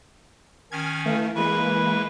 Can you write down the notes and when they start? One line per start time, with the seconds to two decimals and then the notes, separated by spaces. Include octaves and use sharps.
0.72 D#3 C#4 G#5 F6 G#6
1.06 E3 A3 F5
1.36 E3 G#3 A#3 B4 B5 C#6